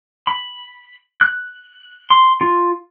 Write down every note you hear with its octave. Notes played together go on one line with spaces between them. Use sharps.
B5
F#6
C6
F4